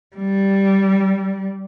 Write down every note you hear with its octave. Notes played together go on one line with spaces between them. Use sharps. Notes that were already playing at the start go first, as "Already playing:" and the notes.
G3